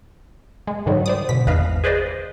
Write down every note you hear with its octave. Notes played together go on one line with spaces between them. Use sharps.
G#3
G#2 D3 D#3 F#3 G3
C5 D5 D#6
B2 D3 B6
G#1 E2 B4 D#5 F5
G#4 B4 C5 D5 D#5